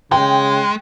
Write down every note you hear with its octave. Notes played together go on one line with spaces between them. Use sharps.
C#3 G#3 G5